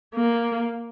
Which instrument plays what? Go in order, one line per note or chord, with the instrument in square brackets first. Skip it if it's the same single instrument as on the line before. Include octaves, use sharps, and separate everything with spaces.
[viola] A#3